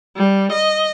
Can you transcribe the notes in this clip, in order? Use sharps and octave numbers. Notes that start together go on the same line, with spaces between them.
G3
D#5